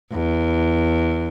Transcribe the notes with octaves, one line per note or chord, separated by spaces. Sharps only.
E2